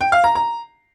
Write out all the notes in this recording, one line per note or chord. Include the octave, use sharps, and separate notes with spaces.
G5
F5
A#5
A#5